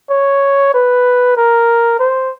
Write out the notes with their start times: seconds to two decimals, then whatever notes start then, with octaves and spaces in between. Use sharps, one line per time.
0.10 C#5
0.74 B4
1.37 A#4
1.99 C5